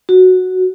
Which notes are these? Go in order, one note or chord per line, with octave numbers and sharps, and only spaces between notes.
F#4